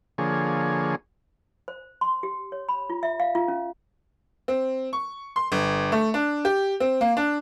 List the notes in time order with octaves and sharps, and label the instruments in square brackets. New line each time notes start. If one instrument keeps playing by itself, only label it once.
[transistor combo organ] D3 F3 A#3 G#4 C#5
[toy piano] C5
C6
G4
C#5
B5
F4
E5
F5
F4
C#4
[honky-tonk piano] C4
C#6
C6
G1
A3
D4
G4
C4
A#3
D4